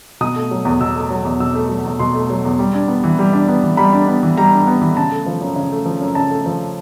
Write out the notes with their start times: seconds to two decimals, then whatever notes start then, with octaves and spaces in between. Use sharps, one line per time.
0.21 B2 D#6
0.36 A3
0.51 F#3
0.65 E2
0.80 B2 E6
0.95 A3
1.10 F#3
1.25 E2
1.40 B2 E6
1.55 A3
1.69 F#3
1.85 E2
1.99 B2 C6
2.15 A3
2.30 F#3
2.45 E2
2.59 G3
2.74 D4
2.88 B3
3.04 E3
3.19 G3
3.33 D4
3.49 B3
3.63 E3
3.77 G3 B5
3.93 D4
4.07 B3
4.23 E3
4.37 G3 A#5
4.53 D4
4.67 B3
4.81 E3
4.97 C#3 A5
5.11 A3
5.26 F3
5.41 F#2
5.56 C#3
5.72 A3
5.86 F3
6.01 F#2
6.15 C#3 A5
6.31 A3
6.46 F3